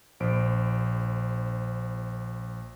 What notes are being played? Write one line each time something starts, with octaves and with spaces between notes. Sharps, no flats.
A#1 C5 D7